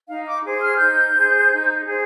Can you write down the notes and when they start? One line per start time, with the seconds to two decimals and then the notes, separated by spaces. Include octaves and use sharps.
0.07 D#4 F5
0.26 D6
0.43 G#4 C5
0.61 F6
0.79 D#4 G6
1.14 G#4 C5
1.50 D#4
1.85 G#4 C5